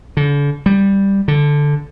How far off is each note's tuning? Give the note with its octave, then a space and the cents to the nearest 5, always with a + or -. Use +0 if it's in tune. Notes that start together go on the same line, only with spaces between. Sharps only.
D3 -35
G3 +5
D3 -5